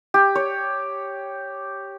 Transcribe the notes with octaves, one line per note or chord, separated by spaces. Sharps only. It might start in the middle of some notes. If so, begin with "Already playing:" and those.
G4
C#5